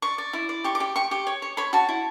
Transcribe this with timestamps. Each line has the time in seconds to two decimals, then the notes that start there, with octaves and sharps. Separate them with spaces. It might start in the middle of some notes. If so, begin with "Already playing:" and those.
0.02 D5 C#6
0.18 D5
0.33 E4
0.49 D5
0.64 G4 C#6
0.75 D6
0.80 G4
0.96 G4 C#6
1.11 G4
1.27 C#5
1.42 C#5
1.57 C#5 B5
1.73 F#4 A5
1.89 E4